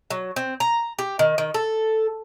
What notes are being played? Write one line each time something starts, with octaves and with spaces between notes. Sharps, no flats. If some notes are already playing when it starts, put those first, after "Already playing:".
F#3
C4
A#5
G4
D#3
D#3
A4